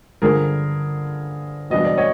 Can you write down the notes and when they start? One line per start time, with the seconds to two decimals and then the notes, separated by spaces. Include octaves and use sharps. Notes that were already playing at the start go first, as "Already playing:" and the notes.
0.22 G2 D3 F3 G#4 A#4
1.70 E2 B2 G3 B3 D4 D#5
1.85 D5
1.97 C#5 D#5